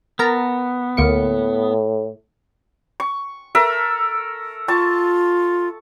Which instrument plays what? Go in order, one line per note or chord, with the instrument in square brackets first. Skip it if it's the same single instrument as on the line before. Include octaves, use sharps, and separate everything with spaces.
[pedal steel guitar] B3 [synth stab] A#4 A5 A#5
[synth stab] D2 A#3 C#7 [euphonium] A2
[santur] C#6
A4 A#4 E5
[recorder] F4 [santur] A5 C#6